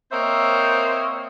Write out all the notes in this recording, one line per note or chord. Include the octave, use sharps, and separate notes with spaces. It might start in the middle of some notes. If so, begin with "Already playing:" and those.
A#3 C4 C5 C#5 D#5 E5